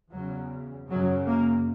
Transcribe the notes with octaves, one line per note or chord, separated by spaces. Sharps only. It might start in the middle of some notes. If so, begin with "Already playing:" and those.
E2 C#3 F#3
F#2 C#3 F#3
A#3